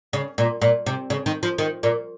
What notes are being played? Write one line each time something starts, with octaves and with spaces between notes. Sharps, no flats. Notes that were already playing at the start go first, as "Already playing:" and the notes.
C#3
A#2
A#2
C3
C#3
D#3
F3
D#3
A#2